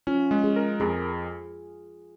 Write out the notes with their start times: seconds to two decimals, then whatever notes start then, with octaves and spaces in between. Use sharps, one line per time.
0.07 C#4 F4
0.31 G#3
0.44 G#4
0.56 A#4
0.80 F2 G#4